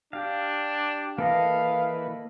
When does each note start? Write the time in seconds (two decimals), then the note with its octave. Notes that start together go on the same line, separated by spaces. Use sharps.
0.13 D4 G4 F5
1.18 E3 A#3 A4 B4 D#5 F5